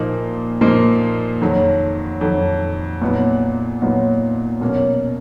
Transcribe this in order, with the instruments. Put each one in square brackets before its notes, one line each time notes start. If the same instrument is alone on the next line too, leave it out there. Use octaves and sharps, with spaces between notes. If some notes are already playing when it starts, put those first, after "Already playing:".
Already playing: [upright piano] A#2 F3 A#3 D#4
A#2 F3 A#3 D#4
F2 D#3 F#3
F2 D#3 F#3
A#2 F#3 B3 D#4
A#2 F#3 B3 D#4
B2 F#3 A#3 C#4